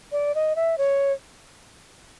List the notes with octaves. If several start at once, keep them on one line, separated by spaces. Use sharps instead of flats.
D5
D#5
E5
C#5